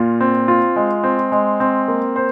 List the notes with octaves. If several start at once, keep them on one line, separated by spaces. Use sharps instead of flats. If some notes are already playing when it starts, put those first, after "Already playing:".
Already playing: A#2 F4
C4
F4
G#3
C4
G#3
C4
A#3
C5